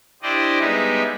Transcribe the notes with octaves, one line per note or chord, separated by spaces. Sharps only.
D4 E4 G4 C5 D5 D#5
G3 G#3 B3 D#4 E5